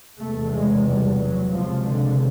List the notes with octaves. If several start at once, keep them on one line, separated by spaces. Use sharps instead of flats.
F1 E2 B2 A3
G#3
G3
F#3
C#2 C3 F3
D3